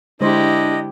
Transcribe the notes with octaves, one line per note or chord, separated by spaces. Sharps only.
D3 G#3 D4 E4 G4 C5 D#5